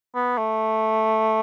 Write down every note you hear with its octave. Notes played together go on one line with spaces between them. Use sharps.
B3
A3